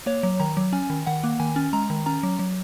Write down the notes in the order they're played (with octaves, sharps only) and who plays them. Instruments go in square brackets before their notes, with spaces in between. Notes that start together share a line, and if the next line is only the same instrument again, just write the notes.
[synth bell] A#3 C#5
F#3
D#3 A#5
F#3
C#4 G#5
D#3
D#3 F#5
A#3
D#3 G#5
C#4
G#3 A#5
D#3
C#4 A#5
F#3
F#3